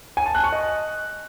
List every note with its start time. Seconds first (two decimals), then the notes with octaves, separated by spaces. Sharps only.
0.17 G#5
0.26 A5
0.35 F#6
0.44 C#6
0.52 D#5